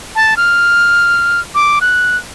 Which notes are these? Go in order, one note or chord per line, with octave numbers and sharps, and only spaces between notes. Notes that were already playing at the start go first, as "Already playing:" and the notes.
A5
F6
D6
F#6